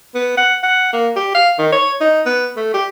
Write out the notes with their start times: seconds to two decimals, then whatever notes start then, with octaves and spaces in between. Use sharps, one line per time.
0.14 B3
0.37 F#5
0.63 F#5
0.93 A#3
1.16 G4
1.34 F5
1.59 D#3
1.72 C#5
2.01 D#4
2.26 B3
2.56 A3
2.74 G4